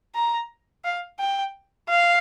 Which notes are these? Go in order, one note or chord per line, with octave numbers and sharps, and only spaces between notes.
A#5
F5
G5
F5